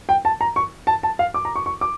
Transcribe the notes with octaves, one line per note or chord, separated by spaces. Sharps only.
G5
A5
A#5
C#6
A5
A5
F5
D6
A#5
C#6
C#6
D6